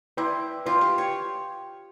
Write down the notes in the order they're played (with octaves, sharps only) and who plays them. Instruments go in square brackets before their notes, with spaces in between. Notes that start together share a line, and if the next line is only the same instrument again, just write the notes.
[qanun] E4 [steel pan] B4 D5 G5 C6
[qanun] F4 [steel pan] B4 D5 G5 C6
[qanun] G4
C#5